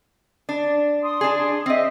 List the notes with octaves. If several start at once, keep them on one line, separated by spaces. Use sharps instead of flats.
D4
C6 D#6
D4 G#4
C4 D#5 E5 G5